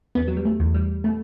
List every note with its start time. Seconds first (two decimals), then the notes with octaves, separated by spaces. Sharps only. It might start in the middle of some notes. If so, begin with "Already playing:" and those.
0.15 E2 B3
0.28 F#3
0.37 G3
0.45 A3
0.60 E2
0.74 G3
1.04 B2 A3